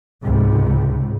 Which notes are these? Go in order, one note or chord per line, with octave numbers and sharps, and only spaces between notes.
C#2 G#2 C3